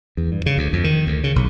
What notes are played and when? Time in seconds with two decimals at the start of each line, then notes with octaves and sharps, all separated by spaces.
0.17 E2
0.32 G2
0.46 C#3
0.58 D2
0.73 F2
0.84 D#3
1.07 D2
1.24 C#3
1.36 B1